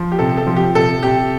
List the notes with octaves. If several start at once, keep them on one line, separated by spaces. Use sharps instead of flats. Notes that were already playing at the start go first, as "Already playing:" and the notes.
Already playing: F3
G4
C3 A4
A4
F3
G4
C3 A4
C3 G4